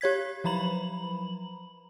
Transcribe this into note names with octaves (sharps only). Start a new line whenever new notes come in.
G4 C#5 G#6 B6
F3 F#3 A#5 B5 F#7